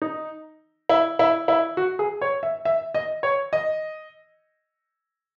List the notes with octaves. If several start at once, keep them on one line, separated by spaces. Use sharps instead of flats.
D#4
E4
E4
E4
F#4
G#4
C#5
E5
E5
D#5
C#5
D#5